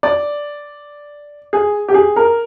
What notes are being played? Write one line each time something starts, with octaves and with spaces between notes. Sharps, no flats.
D5
G#4
G4
G#4
A#4